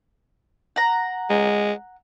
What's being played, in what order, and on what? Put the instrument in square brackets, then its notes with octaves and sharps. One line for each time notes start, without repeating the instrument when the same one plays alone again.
[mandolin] F#5 A#5
[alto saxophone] G#3